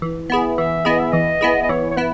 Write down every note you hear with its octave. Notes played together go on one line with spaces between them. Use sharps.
E3
B3 E4 G#4
E3 E5
B3 E4 G#4 D#5
E5
E3 D#5
B3 E4 G#4
D#5
E3 C#5
C#5
B3 E4 B4